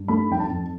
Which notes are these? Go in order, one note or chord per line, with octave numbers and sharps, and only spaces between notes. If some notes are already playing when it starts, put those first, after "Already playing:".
Already playing: G2
A3 B5
F2 G5
A5
F2